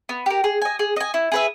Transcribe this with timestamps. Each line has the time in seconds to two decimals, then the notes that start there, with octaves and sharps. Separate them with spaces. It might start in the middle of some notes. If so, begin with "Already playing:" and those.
0.09 B3
0.26 G4 A#4
0.44 G#4
0.62 D#5 G#5
0.79 G#4
0.96 D#5 G#5
1.14 E4
1.32 G#4 B4 E5